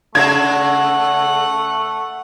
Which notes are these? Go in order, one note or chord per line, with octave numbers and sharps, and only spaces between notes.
C#3 A3 E5 F#5 G#6